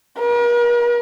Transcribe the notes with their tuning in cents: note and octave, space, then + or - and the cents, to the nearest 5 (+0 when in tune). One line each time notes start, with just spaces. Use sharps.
A#4 +45